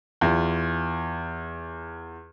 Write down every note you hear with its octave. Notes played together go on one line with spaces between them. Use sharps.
E2 F4